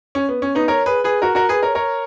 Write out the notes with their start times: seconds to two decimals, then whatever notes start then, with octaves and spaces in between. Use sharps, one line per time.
0.15 C#4
0.29 B3
0.42 C#4
0.55 B3 D#4
0.68 A#4 C#5
0.86 G#4 B4
1.04 G#4 B4
1.22 F#4 A#4
1.35 F#4 A#4
1.49 G#4 B4
1.63 A#4 C#5
1.75 A#4 C#5